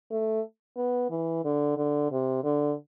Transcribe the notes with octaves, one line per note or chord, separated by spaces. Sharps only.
A3
B3
E3
D3
D3
C3
D3